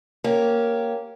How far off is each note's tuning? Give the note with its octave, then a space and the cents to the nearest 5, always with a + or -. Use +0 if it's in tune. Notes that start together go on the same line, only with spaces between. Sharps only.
A#3 +0 C#4 +0 G4 -10